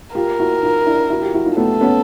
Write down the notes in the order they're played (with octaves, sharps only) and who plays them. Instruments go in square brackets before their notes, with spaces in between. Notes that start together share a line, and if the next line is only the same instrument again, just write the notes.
[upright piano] F4 G4 [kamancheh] A#4
[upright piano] E4 F#4
D#4 F4
D4 E4
E4 F#4
F4 G4
E4 F#4
D#4 F4
[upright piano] A3 B3 [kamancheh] A4
[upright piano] B3 C#4